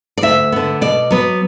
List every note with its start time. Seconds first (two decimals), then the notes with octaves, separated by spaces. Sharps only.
0.18 D5
0.22 D2 E5
0.52 D3 B3
0.81 B2 D5
1.11 F#3 B3